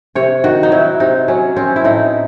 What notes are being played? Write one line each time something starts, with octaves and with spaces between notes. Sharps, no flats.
C3 C#5
D#3 F#4
D#4
F#3 E4
C3 D#4
F#3 C#4
C4 C#4
E4
A2 D#4